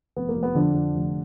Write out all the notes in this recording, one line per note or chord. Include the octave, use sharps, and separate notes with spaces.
F1 B3
A#3
F1
B3
F2 D3 D4
F2
F1